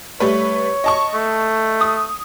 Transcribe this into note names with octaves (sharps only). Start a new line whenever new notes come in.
G3 A3 B4 C#5
D#5 A5 C#6
A3
D#6